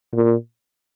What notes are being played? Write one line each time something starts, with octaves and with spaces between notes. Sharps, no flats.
A#2